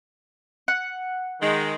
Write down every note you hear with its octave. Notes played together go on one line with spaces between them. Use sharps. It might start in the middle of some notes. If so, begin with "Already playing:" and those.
F#5
D#3 G#3